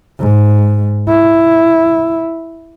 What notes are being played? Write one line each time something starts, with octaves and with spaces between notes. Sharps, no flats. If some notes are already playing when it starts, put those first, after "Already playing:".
G#2
E4